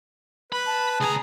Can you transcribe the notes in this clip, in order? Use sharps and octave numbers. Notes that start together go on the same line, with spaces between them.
B4 B5
A5
C#2 G#4 A#5